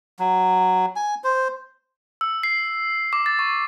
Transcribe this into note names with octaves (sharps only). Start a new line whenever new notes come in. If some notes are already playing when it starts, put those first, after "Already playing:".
F#3
G#5
C5
E6
C7
D6
A6
C#6